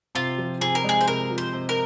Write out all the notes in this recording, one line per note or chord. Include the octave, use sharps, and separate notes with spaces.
C3 F4
F3
C3 G#4
A#4
G#3 G#4
C5
C3 A#4
F3
C5
C3
A#4